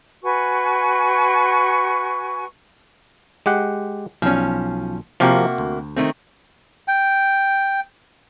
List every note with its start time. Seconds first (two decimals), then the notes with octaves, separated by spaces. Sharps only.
0.23 F#4 B4 G#5 C#6
3.46 G#3 G4 F#5
4.22 B1 F3 C#4
5.20 C3 F3 A#3 F#4 G4 A#4
5.58 D2
5.96 D#3 A3 C4
6.88 G5